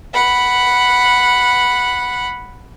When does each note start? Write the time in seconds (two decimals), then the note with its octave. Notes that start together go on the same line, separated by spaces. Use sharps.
0.14 F#5 B5